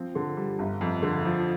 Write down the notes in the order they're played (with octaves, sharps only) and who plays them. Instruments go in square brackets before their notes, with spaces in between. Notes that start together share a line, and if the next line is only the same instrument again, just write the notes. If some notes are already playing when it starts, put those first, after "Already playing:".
Already playing: [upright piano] F3 C4
D3
G3
G1
F2
D3
F3